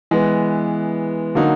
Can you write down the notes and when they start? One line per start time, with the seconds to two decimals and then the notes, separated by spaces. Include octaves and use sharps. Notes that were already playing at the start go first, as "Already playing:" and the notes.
0.11 E3 G#3 B3
1.35 D3 F#3 A#3 D#4 F#4